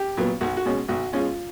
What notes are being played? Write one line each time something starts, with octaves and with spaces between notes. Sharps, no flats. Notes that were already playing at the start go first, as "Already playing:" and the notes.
Already playing: G4
A#2 F#3 B3
B1 F#4
F#4
B2 G#3 C#4
B1 F#4
B2 G#3 C#4 F4